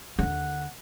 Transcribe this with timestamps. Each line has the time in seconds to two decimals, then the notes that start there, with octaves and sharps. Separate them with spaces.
0.19 D#2 D3 F#5